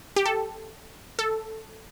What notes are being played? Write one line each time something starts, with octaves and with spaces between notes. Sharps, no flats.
G4
A4
A4